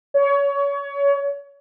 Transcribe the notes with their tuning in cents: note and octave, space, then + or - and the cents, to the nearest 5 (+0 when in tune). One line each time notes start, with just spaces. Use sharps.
C#5 +25